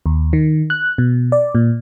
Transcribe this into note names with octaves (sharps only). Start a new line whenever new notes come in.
D#2
D#3
F#6
B2
D5
A#2